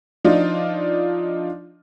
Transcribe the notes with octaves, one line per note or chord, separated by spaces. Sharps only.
F3 D4 D#4 F4